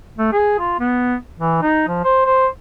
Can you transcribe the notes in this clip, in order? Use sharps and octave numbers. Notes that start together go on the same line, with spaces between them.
A3
G#4
F4
B3
E3
D#4
F3
C5
C5